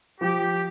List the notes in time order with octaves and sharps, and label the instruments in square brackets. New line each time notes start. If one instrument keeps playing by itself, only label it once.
[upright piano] F3 [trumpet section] G4